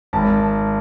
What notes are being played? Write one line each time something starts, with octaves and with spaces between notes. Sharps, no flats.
G#1 A5